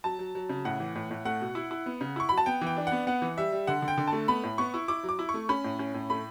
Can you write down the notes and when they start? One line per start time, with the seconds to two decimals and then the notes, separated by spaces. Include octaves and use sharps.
0.04 F#3 A5
0.19 F#3
0.35 F#3
0.49 C#3
0.65 A2 F#5
0.80 E3
0.95 A2
1.11 A2
1.25 A3 F#5
1.41 B2
1.55 E4
1.71 E4
1.86 B3
2.01 C#3
2.16 E4 C#6
2.29 F#3 B5
2.38 A5
2.46 B3 G5
2.61 E3
2.67 G5
2.77 D4
2.87 B3 F#5
3.07 B3 F#5
3.22 E3
3.37 G3 E5
3.52 G3
3.67 D3 F#5
3.82 D3
3.88 G5
3.98 D3
4.08 A3 A5
4.28 B3 B5
4.43 A2
4.58 B3 C#6
4.74 E4
4.88 E4 D6
5.03 F#3
5.09 D6
5.19 E4
5.29 C#6
5.34 A3
5.49 C#4 B5
5.64 A2
5.79 C#4
5.94 A2
6.10 A3 B5